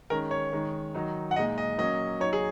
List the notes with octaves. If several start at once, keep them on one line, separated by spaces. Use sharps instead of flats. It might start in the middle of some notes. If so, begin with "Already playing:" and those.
D#3 G#3 C#4 A#4
C#5
D#3 G#3 D#4
D#3 F#3 D#4
F#5
A#2 G#3 D#4 D#5
D#5
F#3 A#3 C#4 D#5
F#3 D#4 C#5
G#4